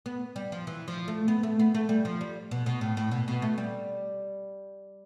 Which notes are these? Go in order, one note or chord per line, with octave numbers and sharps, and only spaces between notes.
B3
G3
F3
E3
F3
A3
B3
A3
B3
A3
G3
F3
G3
B2
B2
A2
A2
B2
B2
A3
G3